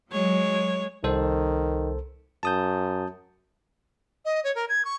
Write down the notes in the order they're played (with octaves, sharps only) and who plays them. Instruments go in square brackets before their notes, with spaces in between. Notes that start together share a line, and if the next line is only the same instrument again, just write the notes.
[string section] F#3 [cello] G#3 [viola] C#5
[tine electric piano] C2 A4 C5 [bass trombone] D#3
[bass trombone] F#2 [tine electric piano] A5 D#6 G6
[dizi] D#5
C#5
A#4
G#6
C#6